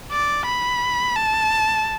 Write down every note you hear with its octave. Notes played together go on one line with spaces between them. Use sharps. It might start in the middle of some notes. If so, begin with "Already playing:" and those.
D5
B5
A5